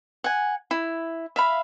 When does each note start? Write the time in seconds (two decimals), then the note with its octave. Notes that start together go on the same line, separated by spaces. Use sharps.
0.24 F#5 G#5
0.71 E4
1.36 E5 F5 B5